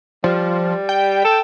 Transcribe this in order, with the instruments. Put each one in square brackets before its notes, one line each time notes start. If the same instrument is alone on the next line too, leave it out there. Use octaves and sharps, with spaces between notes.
[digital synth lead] F3 [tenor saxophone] G3
[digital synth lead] G5
[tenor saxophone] A4